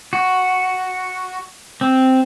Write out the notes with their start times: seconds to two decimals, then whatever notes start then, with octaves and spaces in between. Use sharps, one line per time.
0.13 F#4
1.81 C4